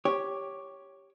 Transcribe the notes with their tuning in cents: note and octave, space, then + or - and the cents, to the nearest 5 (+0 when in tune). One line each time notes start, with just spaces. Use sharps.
G4 +0 C#5 +0